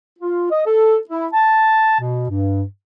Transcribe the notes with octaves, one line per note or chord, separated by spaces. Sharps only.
F4
D#5
A4
E4
A5
B2
G2